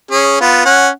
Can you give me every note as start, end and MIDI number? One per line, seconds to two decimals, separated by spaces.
0.11 0.38 61
0.11 0.38 68
0.41 0.64 59
0.41 0.64 65
0.65 0.89 61
0.65 0.89 78